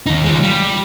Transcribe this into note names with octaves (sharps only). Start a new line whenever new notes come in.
D#2 D#4
G#3 F4
G3